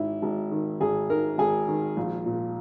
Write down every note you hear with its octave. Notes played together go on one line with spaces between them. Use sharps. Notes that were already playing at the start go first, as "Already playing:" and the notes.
Already playing: G#1 G#2 E4
G#1
D#3
G#1 G#4
G#2 A#4
G#1 G#4
D#3
A#1
A#2